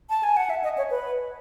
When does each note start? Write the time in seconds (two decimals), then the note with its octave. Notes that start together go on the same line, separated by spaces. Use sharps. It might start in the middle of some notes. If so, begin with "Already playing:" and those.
0.10 A5
0.23 G#5
0.37 F#5
0.50 E5
0.64 D#5
0.78 C#5
0.90 B4